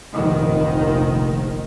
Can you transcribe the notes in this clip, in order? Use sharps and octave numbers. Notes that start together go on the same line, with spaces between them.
F1 A#1 D#3